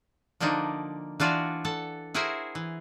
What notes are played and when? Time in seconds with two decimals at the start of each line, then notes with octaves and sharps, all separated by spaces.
0.40 D3 F3 A#3 D4 D#4
1.20 E3 D4 F4 F#4 D5
1.65 A4 F#5 A5
2.14 E4 F#4 G#4 A#4 C5 E5
2.55 E3